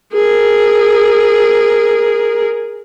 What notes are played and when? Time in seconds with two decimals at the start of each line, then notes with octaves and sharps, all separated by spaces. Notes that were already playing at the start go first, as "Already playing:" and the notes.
0.13 G#4 A#4